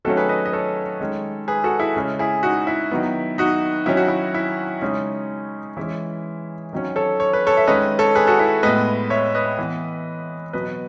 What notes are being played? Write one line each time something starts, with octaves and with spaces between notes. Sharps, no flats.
D#3 F#3 A3 C#4 F#4 A4
G#4 B4
B4 D#5
D#5
A4 C#5
D#3 G#3 C#4
G#4 B4
F#4 A4
E4 G#4
C#3 G#3 C#4
E4 G#4
D#4 F#4
E4
D#3 F#3 B3
D#4 F#4
D#3 F#3 C#4 E4
F#4
E4
E4
C#3 G#3 C#4 D#4
E3 G#3 C#4 E4
D#3 F#3 C#4
A4 C#5
C#5
B4
A4 C#5
E5
D#3 G#3 C#4 B4 D#5
A4 C#5
G#4 B4
F#4 A4
E4
A2 G#3 B3 B4 D#5
C#5 E5
B4 D#5
E3 B3
B2 F#3 B3 B4 D#5